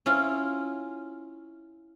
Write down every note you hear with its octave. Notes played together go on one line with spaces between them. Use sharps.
C#4 E4 F4